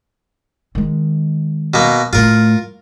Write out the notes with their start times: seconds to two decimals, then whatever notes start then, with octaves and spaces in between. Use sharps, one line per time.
0.75 D#3 G#3
1.74 B2 A#3
2.13 A2 A3 F4 A#4